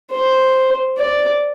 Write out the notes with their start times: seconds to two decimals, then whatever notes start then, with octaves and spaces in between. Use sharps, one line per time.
0.11 C5
0.98 D5